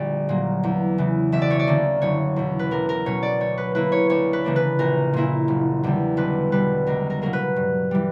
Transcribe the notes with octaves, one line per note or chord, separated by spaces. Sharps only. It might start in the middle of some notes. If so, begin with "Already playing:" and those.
Already playing: A#1 D3 G3 D5
A#2 F#3 A#3
E2
C#3 E3
E1 E5
D5
C#5
D5
D2 D3 A#3 C#4
F#1 C#5
E2 B2
B4
B1 A#4
A#4
B2 F#3 C#4 C#5
D5
D2 C#5
B4
D3 A#3 E4 B4
C#5
D2 C#5
B4
C#3 E3 A#3 D4
B4
A#1 A#4
A#2 A#3 E4
F#1
E2 D3 G3
B1 B4
B2 G3 B4
C#2 A#4
A#4
B2 F#3 A#3 A#4
B4
G2
E3 G3